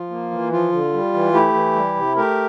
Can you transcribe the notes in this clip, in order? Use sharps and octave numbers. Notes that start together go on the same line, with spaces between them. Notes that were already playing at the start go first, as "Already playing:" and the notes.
Already playing: F3 F4
A#3
E3
F3 F4
D3
G3
E3
A3 E4 G4
E3
G3
C3
A3 G4 A#4